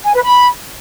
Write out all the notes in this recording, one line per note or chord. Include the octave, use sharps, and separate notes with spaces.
G#5
B4
B5